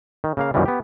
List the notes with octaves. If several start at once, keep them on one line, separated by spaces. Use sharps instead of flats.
D#3
C#3 A#3 F5
F#2 A#2 D#3 E3 G3
B3 G4